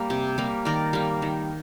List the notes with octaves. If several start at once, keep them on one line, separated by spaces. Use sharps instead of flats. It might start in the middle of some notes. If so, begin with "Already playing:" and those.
Already playing: G3 A#3 A#4
C3
G3 A#3
D#3 A#4 D5
G3 A#3
D#3